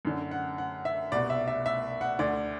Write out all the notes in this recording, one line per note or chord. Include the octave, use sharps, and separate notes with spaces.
F#2 D3
F#5
F#5
E5
C2 B2 D5
E5
E5
E5
F#5
D2 D3 D5